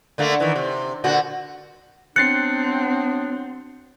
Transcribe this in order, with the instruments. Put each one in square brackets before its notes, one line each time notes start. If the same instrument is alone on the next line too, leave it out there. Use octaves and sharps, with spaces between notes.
[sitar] D3 A3 A#3
D#3 E3
C3
A#2 D3 F#4
[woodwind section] F#3 B3 D4 [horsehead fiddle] C4 [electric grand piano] F#6 A6 C7 [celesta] C#7